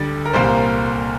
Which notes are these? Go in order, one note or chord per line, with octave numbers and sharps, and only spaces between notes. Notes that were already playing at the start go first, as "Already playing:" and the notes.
Already playing: D2 D3 G3 D5
A#4
C2 A#2 G3 A#3 C5